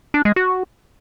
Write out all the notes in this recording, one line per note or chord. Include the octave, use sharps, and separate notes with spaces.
D4
G#3
F#4